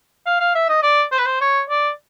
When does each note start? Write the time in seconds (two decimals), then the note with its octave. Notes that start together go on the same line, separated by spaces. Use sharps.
0.26 F5
0.40 F5
0.55 E5
0.69 D#5
0.83 D5
1.12 C5
1.18 B4
1.26 C5
1.41 C#5
1.70 D5